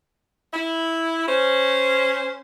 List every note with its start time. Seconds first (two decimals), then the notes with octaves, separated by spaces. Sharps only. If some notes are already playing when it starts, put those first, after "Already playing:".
0.53 E4
1.28 C#4 C5